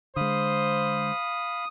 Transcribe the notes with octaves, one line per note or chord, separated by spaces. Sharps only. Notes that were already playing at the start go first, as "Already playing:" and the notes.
D3 G#3 C5 F5 B5 D#6